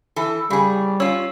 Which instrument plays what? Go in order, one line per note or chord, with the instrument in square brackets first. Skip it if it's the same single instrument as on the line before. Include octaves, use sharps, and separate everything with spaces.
[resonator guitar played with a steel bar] E3 A4
[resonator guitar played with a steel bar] C#3 G#4 [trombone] G3
[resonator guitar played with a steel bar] C#4 F4 [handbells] C#5 E6